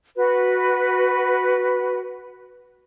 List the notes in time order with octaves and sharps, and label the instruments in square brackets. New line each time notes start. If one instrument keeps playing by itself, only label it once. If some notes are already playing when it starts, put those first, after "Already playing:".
[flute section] F#4 B4